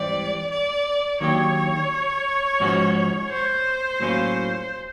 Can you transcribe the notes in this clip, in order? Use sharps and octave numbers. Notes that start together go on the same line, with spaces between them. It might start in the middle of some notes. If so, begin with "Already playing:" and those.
Already playing: G#2 E3 G3 C4 D5
D5
D#3 F#3 A#3 D4 G4 C#5
G#2 F3 G#3 C#4 F#4
C5
A2 F#3 A#3 C#4 F4